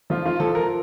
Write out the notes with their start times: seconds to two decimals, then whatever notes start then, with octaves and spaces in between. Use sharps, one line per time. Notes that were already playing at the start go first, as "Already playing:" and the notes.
0.10 F3 F4
0.25 F4
0.40 F3 A4
0.55 A#4